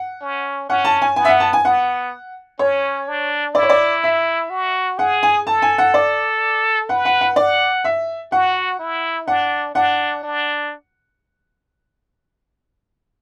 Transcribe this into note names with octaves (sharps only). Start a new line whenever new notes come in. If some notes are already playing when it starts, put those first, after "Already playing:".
Already playing: F#5
C#4
C#4 F#5
A5
G#5
B3 G#5
E5
F#5
A5
G#5
B3 F#5
C#4 C#5
D4
E4 D5
C#5
D5
E5
F#4
G#4 F#5
G#5
A4 A5
G#5
F#5
D5
B4 F#5
F#5
F#5
D5 F#5
E5
F#4 F#5
E4
D4 F#5
D4 F#5
D4